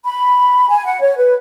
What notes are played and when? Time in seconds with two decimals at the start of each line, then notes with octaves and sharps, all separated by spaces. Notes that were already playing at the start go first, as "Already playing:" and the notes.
0.05 B5
0.69 G#5
0.85 F#5
1.01 C#5
1.17 B4